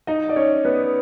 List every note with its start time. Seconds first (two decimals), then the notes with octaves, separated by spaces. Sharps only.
0.07 D#4 D#5
0.29 D5
0.36 C#4 C#5
0.65 B3 B4